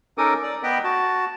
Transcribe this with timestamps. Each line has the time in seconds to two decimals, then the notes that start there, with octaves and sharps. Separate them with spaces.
0.18 C#4 D#4 A4 A#4 D6 D#6
0.43 D5
0.63 B3 B4 D#5 G5 B5
0.84 F#4 A5